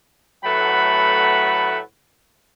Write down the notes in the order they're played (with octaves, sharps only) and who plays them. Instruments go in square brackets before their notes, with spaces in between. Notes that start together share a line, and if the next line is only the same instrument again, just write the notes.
[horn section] A2 F#3 A3 B4 F#5 B5